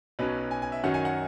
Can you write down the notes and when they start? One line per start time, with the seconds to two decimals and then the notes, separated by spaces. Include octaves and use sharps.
0.19 B1 B2 F#3 C#4 B4
0.51 G#5
0.62 G#5
0.72 E5
0.84 F#2 D#3 F#3 C#4 F#5
0.94 G#5
1.05 F#5